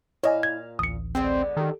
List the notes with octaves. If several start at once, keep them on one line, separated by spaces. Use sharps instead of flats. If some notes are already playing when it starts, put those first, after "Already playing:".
A#2 E4 C#5 D#5 F5 G#5
G#6
A1 D2 D#6 C#7
D3 G#3 B3 C4
D#3 G4 A4